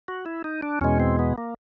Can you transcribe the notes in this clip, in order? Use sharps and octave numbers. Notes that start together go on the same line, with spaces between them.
F#4
E4
D#4
D4
E2 B2 G#3 C#4
C4
B3
A#3